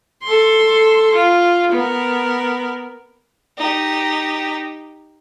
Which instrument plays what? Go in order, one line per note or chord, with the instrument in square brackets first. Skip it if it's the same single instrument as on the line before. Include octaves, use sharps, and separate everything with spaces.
[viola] A4 C6
F4
B3 A#4
[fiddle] D#4 G4